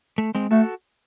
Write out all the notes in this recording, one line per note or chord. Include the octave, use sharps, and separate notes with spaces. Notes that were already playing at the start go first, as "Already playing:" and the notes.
A3
G#3 C4
A3 F#4 A4